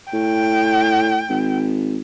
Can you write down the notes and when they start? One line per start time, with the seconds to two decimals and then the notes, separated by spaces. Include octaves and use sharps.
0.13 A2 G5
1.29 G#1